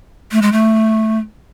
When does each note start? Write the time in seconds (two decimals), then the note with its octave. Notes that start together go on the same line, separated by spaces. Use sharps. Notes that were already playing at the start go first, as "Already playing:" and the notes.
0.32 A3
0.42 G#3
0.52 A3